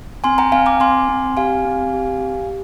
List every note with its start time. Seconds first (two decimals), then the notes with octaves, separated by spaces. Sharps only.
0.24 C4 G#5 C6
0.38 G5 A#5
0.52 C4 F5 G#5
0.66 A#5 D6
0.80 C4 G#5 C6
1.09 C4
1.37 G4 F5 G#5
1.65 C4
1.94 G4
2.21 G4